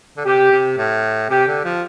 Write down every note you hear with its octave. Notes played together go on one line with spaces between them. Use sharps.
D3
C3 G4
C3
A2
C3 G4
D3
F3